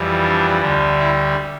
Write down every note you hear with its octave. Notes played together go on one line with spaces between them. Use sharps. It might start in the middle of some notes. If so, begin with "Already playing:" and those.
Already playing: F2 E3 G3
D4
D2 D3 G3
E4